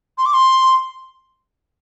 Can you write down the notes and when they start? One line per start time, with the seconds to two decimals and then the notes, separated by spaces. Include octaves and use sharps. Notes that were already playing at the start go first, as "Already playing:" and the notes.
0.18 C6
0.26 D6
0.33 C6